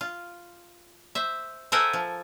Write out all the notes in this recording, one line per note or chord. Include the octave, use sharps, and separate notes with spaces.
F4
C5 E5
A4 A#4 C5 E5 F#5 G#5
F3